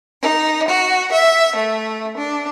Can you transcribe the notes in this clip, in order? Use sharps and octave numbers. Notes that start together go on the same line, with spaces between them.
D#4
F#4
E5
A3
D4